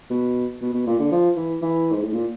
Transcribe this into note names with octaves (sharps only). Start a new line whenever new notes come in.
B2
B2
B2
A#2
D3
F3
E3
E3
G#2
A2
A#2